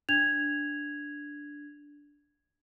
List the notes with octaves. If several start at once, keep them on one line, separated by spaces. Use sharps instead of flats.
D4 G#6 F7